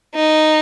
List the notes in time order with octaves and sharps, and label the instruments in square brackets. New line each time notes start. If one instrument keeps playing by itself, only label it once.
[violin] D#4